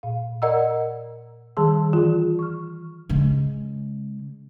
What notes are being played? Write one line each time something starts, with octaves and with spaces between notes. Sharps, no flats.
A#2 F5
A#4 D5 D#5 F#5 A#5 E6
D#3 G3 G#4 A5 C6 E6
E3 F4 G#4 D5
C#6 F6
C#3 G#3